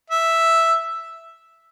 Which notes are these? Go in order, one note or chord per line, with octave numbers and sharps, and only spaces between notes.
E5